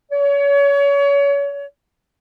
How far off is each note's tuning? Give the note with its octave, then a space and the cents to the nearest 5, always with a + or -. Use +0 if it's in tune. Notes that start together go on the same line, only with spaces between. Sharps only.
C#5 +30